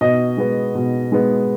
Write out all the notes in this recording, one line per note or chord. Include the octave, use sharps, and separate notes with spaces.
B2 D#5
G#3 B3
B2
G#3 B3